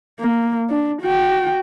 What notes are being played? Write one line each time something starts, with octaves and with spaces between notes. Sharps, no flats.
A#3
D4
F#4 G5